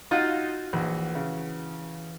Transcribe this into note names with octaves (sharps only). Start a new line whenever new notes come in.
D#4 F4 F#4 F5 E6 G6 G#6
A#1 E3 F#5 A#6
C#3